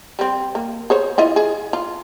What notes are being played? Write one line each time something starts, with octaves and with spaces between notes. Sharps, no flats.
G3 C4
A#3
G#4 C5 C#5
E4 F4 D#5
G#4
F4